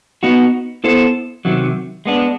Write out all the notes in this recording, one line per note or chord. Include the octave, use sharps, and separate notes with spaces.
B3 D#4 F#4
B3 E4 A4 C5
C3 D#3 F#3
G#3 B3 D4